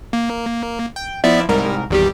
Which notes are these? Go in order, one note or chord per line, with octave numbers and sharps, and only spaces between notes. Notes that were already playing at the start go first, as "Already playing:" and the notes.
A#3
G5
F3 B3 E4 D5 E5
C2 G#2 G3 A#4
G#1 E2 D#3 G3 G4